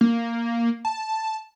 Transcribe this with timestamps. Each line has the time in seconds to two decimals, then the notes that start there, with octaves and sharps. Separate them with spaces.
0.01 A#3
0.85 A5